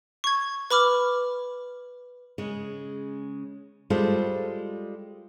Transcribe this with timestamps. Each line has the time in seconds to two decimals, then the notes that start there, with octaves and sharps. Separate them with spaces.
0.24 C#6 G#6
0.71 B4 B5 D6 F6
2.38 C#3 G#3
3.90 G3 G#3 F4 A4 C5